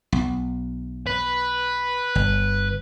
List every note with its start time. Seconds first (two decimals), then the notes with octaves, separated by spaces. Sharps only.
0.12 B1
1.07 B4
2.15 G1